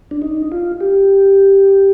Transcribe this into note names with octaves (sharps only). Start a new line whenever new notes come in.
D4
D#4
F4
G4